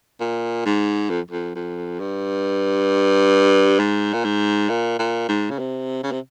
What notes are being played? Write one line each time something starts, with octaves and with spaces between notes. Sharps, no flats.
A#2
G#2
F2
F2
F2
G2
G#2
A#2
G#2
A#2
A#2
G#2
C#3
C3
C#3
C3